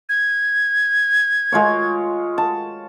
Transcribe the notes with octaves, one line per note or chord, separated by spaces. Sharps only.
G#6
G#3 F4 C#5
A5